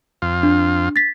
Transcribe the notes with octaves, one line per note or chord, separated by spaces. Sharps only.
F2 F4
D4
A6 B6